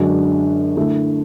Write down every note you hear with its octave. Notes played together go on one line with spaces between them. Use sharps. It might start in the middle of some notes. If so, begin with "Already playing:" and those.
Already playing: F#2 D3 G#3 D4 F#4
D3 A3 E4